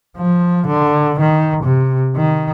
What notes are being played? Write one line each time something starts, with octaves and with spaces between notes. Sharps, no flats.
F3
D3
D#3
C3
D#3